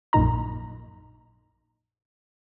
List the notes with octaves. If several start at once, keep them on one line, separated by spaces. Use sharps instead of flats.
A#1 F#2 A#2 D#4 A#5